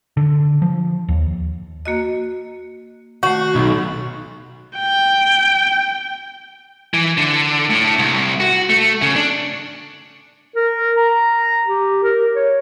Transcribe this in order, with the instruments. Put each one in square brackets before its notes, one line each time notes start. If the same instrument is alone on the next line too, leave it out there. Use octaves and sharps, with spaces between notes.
[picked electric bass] D3
F3
D#2
[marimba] A#3 F#4 D#5
[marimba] D#3 A3 [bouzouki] F#4
[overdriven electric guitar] B1
[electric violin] G5
[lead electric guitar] E3
D3
A2
C2
F#4
A3
C#3
D4
[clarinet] A#4
A#5
G4
A#4
C#5